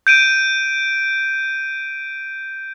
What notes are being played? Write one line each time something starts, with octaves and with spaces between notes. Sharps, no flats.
G6 D7 D#7